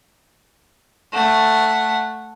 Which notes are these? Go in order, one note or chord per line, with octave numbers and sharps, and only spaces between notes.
A3 F#5